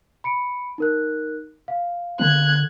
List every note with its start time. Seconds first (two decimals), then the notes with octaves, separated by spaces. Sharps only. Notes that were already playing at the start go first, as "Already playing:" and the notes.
0.24 B5 C#7 D7
0.78 D#4 A#4 F#6
1.68 F5
2.19 D3 F#6 G#6